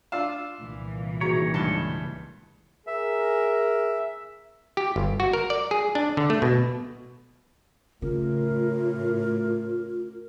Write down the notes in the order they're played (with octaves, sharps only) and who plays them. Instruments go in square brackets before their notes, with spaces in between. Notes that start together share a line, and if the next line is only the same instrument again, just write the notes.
[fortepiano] D4 F4 F5 [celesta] E6 E7
[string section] C2 A#2 E3
[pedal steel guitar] D#3 C#5 [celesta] F#4 G#4 [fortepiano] A#5
[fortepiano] C#2 G2 A5 [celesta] G#6 G7
[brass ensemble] G#4 A#4 [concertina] E5
[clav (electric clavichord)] G4
G1
F#4
A#4
D5
G#4
D4
D3
A3
B2
[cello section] A2 [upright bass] C#3 [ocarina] F4 [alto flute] A#4